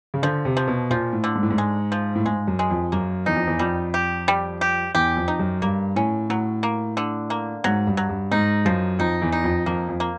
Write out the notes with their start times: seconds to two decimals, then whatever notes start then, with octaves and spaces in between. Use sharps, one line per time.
0.14 C#3
0.23 D3 F3
0.45 C3
0.57 F3
0.68 B2
0.90 A#2 F3
1.13 A2
1.24 D3
1.36 G#2
1.43 A2
1.50 G#2
1.58 G#3
1.92 F3
2.15 A2
2.25 G#2 G#3
2.48 F#2
2.59 G#3
2.71 F2
2.92 F#2 A#3
3.26 E2 D#4
3.36 F2
3.47 E2
3.59 F2 G3
3.94 G4
4.28 G3
4.61 G4
4.95 E2 G4
5.17 F2
5.28 D#4
5.39 F#2
5.62 G2 A#3
5.96 A2 C#4
6.30 A2 F#3
6.63 A#3
6.97 D3
7.30 A#3
7.64 G#2 F#3
7.87 G2
7.97 F#3
8.09 G2
8.31 G#2 D#4
8.65 F#2 F3
8.99 F2 D#4
9.22 E2
9.32 D#4
9.44 F2
9.66 F2 A#3
9.89 F2
10.00 A#3